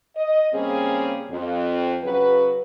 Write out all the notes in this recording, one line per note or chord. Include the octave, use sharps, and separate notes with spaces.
D#5
C#3 G3 A#3 C4 C#4 G#4
F2
C#3 F#3 F#4 B4